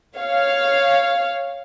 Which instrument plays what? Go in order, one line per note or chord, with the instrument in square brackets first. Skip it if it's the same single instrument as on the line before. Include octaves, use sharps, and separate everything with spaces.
[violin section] C#5 F5